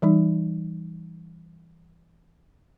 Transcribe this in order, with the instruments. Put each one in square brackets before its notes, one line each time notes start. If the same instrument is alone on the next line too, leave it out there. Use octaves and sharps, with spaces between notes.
[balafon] E3 G3 D#4